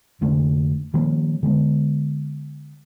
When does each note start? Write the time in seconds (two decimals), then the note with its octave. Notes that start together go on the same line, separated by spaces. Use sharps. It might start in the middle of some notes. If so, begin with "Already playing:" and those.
0.21 F1 D3 A3 D4
0.94 D#3 F3 G3 A#3
1.43 D3 G#3 B3